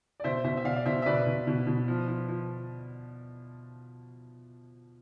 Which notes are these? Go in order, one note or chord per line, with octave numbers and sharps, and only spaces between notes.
D5
B2 C5 E5
B2 C5 E5
E5
B2 D5 F5
D5
B2 C5 E5
E5
B2 B4 D5
B2
B2
B2
F3
F3
F3